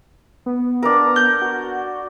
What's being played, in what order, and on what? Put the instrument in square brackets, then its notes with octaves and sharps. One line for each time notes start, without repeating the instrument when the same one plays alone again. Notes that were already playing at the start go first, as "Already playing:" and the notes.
[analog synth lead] B3
[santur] D4 A#4
[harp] G6
[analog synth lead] F#4